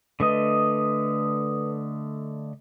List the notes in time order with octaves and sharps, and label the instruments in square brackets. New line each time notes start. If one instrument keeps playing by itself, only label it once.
[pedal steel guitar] D3 A3 D#5 [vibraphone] B4 D#6